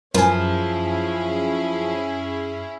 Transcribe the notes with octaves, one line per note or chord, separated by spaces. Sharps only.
F#2 F3 C#4 E4 G#4 A#4 B4 G#5